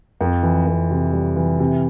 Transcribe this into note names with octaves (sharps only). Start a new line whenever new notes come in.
F2
E3
F2
C3
G3
E3
C3